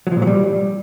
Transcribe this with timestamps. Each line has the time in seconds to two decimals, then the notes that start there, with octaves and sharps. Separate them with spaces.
0.07 F#3
0.12 F3
0.17 A#2
0.22 F#3
0.27 G3